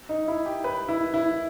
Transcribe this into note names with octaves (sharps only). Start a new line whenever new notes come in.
D#4
E4
G4
B4
E4
E4